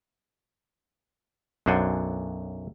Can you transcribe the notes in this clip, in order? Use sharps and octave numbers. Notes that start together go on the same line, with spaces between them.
B1 F#2 D4 C5 F#5 G#5